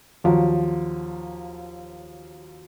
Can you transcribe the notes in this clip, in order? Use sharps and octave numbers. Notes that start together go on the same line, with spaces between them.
D#2 F3 F#3